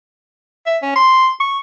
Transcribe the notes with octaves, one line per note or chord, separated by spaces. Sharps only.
E5
C#4
C6
C#6